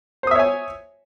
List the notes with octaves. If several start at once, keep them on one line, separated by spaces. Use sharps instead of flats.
C5 C#5 E5 G#5 D#6